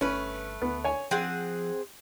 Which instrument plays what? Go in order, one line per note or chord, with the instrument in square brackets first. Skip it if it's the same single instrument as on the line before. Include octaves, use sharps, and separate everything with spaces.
[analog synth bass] G1 [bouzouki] A3 B4 [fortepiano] C#4
[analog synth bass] D2 [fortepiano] B3
[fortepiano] C#5 G#5
[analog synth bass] F3 [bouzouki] C4 G#4 F#5 [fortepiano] G5